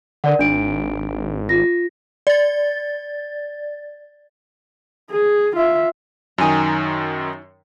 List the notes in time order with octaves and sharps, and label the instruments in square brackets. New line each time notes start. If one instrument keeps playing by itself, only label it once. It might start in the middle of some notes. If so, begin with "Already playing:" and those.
[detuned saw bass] D3 [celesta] A#4 D5 F#5
[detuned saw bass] G#1 [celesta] D4 D7
[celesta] F4 A#6
[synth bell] D5 A6
[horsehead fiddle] G#4
F4 E5
[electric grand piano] F#2 D#3 [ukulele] D#4 G#5 A#5